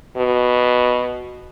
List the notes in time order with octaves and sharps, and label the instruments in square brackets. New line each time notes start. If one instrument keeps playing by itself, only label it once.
[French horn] B2